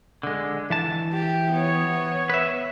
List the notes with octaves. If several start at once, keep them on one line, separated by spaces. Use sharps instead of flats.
D3 G#3
E3 A5
G4
B3 C#5
B4 E5